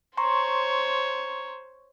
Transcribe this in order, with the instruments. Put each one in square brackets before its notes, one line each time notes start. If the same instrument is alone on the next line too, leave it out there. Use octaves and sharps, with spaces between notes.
[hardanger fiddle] C5 C#5 [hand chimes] A#5 C6 C#6